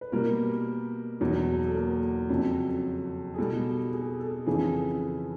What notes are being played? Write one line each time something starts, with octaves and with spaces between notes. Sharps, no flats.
B4
B2 G3 A#3 A#4
E2 B2 F#3
A4
A#3 A#4
F2 C#3 F#3
G#4
B2 G3 A4
G#4
A4
F2 C#3 E3 G#4